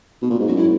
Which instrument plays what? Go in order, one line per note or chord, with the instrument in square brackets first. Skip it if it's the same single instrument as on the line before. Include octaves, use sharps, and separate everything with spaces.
[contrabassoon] B2
A#2
G#2
[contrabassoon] F#2 [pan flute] F#4
[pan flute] E4